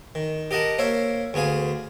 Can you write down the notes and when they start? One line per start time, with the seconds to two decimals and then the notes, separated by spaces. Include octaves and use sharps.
0.15 D#3
0.51 G4 A#4 D#5 F#5 A5
0.78 A#3 C5 C#5 E5 F5
1.34 D2 B3 G#4 F5 G#5